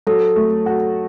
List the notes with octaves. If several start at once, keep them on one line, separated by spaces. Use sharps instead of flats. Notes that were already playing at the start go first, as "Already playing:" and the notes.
F#3 A4
A3
F#4